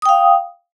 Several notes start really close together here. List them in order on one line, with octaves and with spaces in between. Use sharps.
D#6 G5 F5